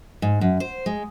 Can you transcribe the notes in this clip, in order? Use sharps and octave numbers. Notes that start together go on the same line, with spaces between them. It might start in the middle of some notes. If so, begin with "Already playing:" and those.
G#2
F#2
C5
G#3